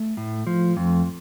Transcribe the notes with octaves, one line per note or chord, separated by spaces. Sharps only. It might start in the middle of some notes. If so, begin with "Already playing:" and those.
Already playing: A3
A2
F3
F2